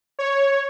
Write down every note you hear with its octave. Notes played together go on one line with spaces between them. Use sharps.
C#5